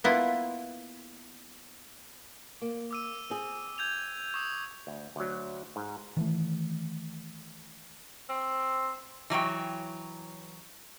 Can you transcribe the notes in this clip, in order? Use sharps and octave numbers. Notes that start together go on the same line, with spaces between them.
A#3 B3 E4 F4
A#3
D6 E6 D#7
C4 G#4
G6 G#6 F7
C#6 D#6
D2
D2 F#3
G#2
D#3 E3 A3
C4
E3 F#3 C#5 G5